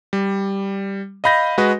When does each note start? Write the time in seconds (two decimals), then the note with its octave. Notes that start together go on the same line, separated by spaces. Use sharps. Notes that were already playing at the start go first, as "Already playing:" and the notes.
0.13 G3
1.24 D#5 F5 B5 G6 A#6
1.58 G#3 F#4 B4 D#5